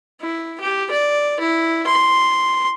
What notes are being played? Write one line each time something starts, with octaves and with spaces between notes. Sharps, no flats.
E4
G4
D5
E4
C6